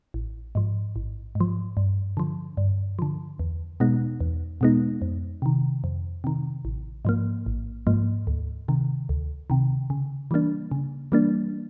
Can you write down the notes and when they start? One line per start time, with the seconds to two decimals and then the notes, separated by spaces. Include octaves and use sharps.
0.14 A1
0.55 G#2 F3
0.96 A1
1.35 G#2
1.41 F3
1.77 G2
2.17 D3 F3
2.57 G2
2.99 D3 F3
3.39 E2
3.80 B2 G#3 B3 D#4
4.21 E2
4.61 B2 G#3 B3 D#4
5.02 F2
5.42 C3 D#3
5.84 F2
6.24 C3 D#3
6.65 A1
7.05 G#2 F3 A#3
7.46 A1
7.87 G#2 F3 A#3
8.27 D2
8.68 C3 D#3
9.09 D2
9.50 C3 D#3
9.90 C#3
10.31 E3 G3 A#3 D4
10.71 C#3
11.12 E3 G3 A#3 D4